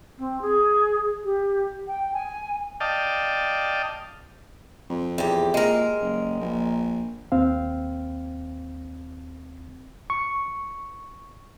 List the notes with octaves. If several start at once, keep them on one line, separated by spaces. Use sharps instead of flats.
C4
G#4
G4
G5
G#5
D5 D#5 F5 G5 A5
F2
E2 G4
A#2 G#3 A#4
F#1
A#1
D#2 C4 F5
C#6